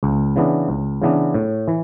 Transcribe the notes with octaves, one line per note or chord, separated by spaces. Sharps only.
C#2
C#3 E3 B3 D4
C#2
C#3 E3 B3 D4
A2
E3